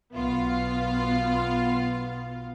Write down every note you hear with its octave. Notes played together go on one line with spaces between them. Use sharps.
B1 B3 F4 F5